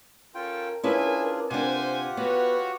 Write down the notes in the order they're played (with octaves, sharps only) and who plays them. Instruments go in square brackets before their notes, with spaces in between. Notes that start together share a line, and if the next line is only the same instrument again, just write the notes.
[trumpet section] C#4 A4 [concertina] F4 G5 [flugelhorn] A#4
[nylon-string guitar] C#4 E4 B4 [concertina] D4 F4 G#4 [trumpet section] E5 G#5
[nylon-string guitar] C3 D4 [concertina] F4 G4 F#5 [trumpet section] C5 G#5
[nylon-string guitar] B3 [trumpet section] F#4 C#5 [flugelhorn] B4